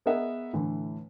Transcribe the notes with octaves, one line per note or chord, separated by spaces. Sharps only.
B3 G#4 A#4 D#5 E5 F#5
A2 D3 E3